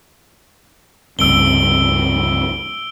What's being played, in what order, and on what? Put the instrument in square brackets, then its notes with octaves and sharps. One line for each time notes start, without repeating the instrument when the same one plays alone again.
[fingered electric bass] C#2 G2 C3 [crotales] E6 D7 G7